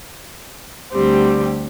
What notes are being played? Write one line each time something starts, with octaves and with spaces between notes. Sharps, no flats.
D2 D3 G3 C4 G4